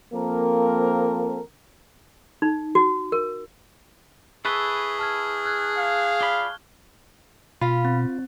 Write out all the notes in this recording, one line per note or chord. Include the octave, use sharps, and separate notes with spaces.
F3 A#3 C4 A4 A#4
D#4
F#4
A#4
E4 G#4 A4 B4 C#6 G7
A5 F6 G#6
F6 F#6 G#6
F5
F4 D5 B5 G7
B2 F4 F5 B5
C4